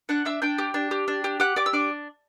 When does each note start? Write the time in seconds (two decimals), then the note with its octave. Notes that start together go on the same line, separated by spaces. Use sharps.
0.09 D4 F#5 F#6
0.25 D4 E5 E6
0.42 D4 G5 G6
0.58 G4
0.74 D4
0.91 G4
1.08 D4
1.24 G4
1.40 G4 F#5 F#6
1.56 G4 D5 D6
1.66 E6
1.73 D4 D5 D6